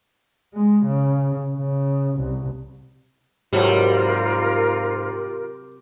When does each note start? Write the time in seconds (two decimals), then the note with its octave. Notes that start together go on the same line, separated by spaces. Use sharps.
0.54 G#3
0.85 C#3
1.57 C#3
2.19 C2
3.53 G#2 C3 F#3 G3 F4 A4 A#4